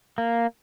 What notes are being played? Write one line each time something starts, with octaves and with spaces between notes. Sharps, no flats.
A#3